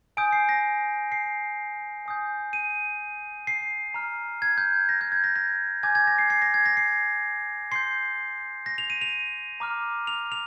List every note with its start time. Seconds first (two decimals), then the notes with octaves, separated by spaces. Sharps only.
0.17 G#5 D#6 G6 D7
0.32 C7
0.49 A#6
1.12 C7
2.06 G#5 D#6 G6
2.53 D#7
3.47 C7
3.94 A#5 F6
4.42 G#6
4.58 G6
4.89 A#6
5.01 G6
5.12 G#6
5.24 A#6
5.36 A#6
5.83 G#5 D6 G6 G#6
5.95 G#6
6.07 A#6
6.18 C7
6.30 C7
6.42 A#6
6.54 G#6
6.66 A#6
6.77 C7
7.72 C6 G6 C7
8.66 A#6
8.78 F7
8.90 D#7
9.01 F7
9.60 A#5 D6 F6
10.07 F7
10.32 F7